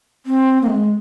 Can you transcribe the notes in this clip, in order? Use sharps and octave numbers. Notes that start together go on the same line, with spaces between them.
C4
A#3
G#3